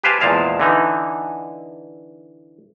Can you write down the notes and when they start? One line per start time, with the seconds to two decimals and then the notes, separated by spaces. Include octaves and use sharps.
0.04 G4 B4 C5 F5 G#5 A5
0.21 E2 A#2 F3 G#3 F5 A5
0.60 D3 E3 D#4